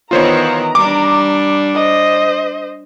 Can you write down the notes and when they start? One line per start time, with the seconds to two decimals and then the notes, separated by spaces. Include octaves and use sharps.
0.11 D#3 E3 B3 F4 C5 C#5 A#5
0.75 G3 D4 D6
1.75 C5 D#5